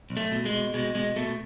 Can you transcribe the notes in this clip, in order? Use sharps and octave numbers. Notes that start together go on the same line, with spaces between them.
B1
A3
B2
G#3
B2
B2 G#3
B2 G#3
B2 A3